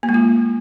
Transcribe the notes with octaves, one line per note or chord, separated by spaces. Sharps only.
A#3
G#3
F4